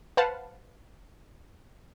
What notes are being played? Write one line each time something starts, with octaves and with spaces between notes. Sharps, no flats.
B4 C5 F5 F#5 A5